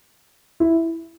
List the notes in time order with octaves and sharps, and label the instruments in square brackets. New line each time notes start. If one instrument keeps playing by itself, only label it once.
[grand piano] E4